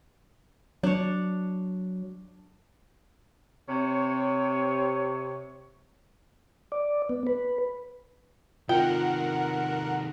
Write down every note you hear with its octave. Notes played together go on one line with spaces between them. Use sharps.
F#3 D4 C#5
C3 C#5
D5
B3
B4
C3 D#3 F4 A#4 F#5 G5